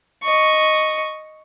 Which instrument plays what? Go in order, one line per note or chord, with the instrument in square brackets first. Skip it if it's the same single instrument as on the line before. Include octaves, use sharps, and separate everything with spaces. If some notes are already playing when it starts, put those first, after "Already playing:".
[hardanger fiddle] D#5 C#6